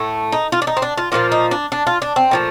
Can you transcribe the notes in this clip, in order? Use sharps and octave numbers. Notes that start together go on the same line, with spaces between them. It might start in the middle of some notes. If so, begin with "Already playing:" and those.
Already playing: A2 A3
D#4
F4
D4
D#4
C4
D4
F4
A#2 F3 A#3 F4
D#4
D4
D4
F4
D4
C4
A#2 F3 A3